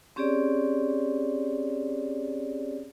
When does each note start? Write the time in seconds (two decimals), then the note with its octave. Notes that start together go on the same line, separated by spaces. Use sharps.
0.16 C4 C#4 G4 G#4 C#5 D5